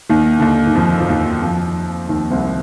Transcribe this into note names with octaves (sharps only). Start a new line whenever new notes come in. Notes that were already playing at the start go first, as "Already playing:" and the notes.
D#2 D#3
D3
D#2 D#3
D#3
F2 F3
F3
D#2 D#3
F2 F3
D#2 D#3
C2 C3